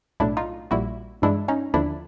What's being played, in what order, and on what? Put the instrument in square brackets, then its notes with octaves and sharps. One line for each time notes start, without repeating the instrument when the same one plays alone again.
[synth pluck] B1 A2 F#3 A3 D4 E4
D#4 F4
A#1 A#2 G3 E4 F#4
G2 E3 G#3 D4 E4
C#4 D#4
D#2 D3 F3 D4 E4